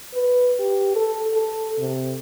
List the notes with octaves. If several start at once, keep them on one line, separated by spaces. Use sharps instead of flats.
B4
G4
A4
A4
C3